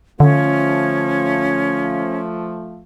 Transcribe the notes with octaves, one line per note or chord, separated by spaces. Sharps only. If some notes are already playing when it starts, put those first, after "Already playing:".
D3 F3 A3 C#4